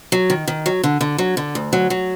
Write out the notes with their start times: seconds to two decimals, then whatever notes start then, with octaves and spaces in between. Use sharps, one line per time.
0.12 F#3
0.30 D#3
0.48 D#3
0.66 F#3
0.84 D3
1.01 D3
1.18 F#3
1.37 D3
1.55 D2
1.73 F#3
1.90 F#3